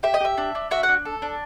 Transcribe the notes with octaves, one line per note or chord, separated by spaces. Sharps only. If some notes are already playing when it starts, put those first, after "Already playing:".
G4 E5
D#5
G4 E5
D4
D4
F#4 E5
F#5
D4
A4
D4